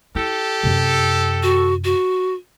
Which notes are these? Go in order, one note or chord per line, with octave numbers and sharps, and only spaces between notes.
E4 G4 A4
F#2 C3
F#4
F#4